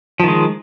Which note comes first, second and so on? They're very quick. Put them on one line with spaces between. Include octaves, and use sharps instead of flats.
F3 D#3 G#3